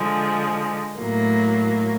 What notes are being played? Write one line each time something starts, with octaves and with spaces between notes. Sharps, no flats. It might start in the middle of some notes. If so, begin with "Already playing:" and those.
Already playing: D3 F3 G#3
A2 F#3 A#3